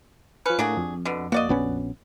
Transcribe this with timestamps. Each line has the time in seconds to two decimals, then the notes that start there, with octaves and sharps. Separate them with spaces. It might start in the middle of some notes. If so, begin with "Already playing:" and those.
0.46 F3 C#4 B4 C#7
0.59 A2 A#3 D4 F#4 G#4
0.77 F2
1.05 B2 D3
1.32 A#3 F#4 D5 D#5
1.49 A#1 B3 C#4